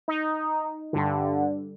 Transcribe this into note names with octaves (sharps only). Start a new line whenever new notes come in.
D#4
G2 D3